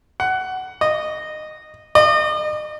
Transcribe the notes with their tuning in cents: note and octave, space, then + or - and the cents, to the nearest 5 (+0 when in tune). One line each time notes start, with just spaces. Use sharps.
F#5 +15
D#5 -15
D#5 -40